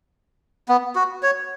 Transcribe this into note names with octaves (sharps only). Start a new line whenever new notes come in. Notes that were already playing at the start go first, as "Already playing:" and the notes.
B3
F#4
C#5